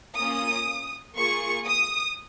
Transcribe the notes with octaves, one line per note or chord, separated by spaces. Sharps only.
A#3 C#4 F4 D#6
A#3 F4 G#4 C#6
D#6